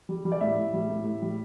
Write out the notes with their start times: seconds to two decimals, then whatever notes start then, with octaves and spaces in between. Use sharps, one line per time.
0.09 G3
0.25 G3
0.32 D5
0.41 A2 E5
0.57 A2
0.73 G3
0.89 A2
1.05 A2
1.22 G3